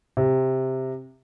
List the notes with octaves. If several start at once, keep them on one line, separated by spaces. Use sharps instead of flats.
C3